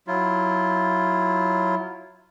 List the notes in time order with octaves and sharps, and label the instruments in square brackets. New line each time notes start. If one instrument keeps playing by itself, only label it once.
[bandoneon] F#3 E4 F4